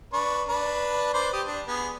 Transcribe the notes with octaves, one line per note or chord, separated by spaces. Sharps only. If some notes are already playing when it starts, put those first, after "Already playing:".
D4 B4 C#6
D4 B4
B4 C5 D5
G4 D#6
D4
B3 G#4